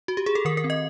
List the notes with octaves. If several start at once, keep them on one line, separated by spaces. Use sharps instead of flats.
F#4
G4
G#4
A4
D#3 A#4
A#4
C4
D#5